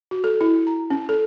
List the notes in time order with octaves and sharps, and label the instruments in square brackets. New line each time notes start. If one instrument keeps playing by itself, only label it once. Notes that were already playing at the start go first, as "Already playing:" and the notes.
[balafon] F#4
A4
E4
A#5
C#4
A4